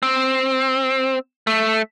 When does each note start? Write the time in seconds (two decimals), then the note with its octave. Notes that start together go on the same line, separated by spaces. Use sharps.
0.03 C4
1.47 A3